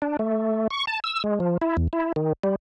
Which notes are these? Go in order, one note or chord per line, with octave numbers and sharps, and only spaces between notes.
D4
A3
C#6
A5
E6
G#3
F3
E4
E2
E4
D#3
G3